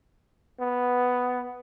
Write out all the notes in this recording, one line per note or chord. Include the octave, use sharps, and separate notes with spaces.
B3